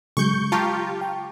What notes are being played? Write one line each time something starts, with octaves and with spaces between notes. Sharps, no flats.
C#3 F#3 G#3 C#6 G6
F4 G4 A5 A#5 C#6
G5